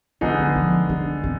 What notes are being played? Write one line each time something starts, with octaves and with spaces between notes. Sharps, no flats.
D3 D#3 G#3 B3 D#4 G#4
F3
F3
D4
C4